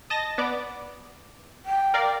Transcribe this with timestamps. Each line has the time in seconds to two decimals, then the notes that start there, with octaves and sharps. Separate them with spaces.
0.10 D#5 A5 A#6
0.38 B3 D5 D6
1.66 G5
1.94 A#4 D5 F5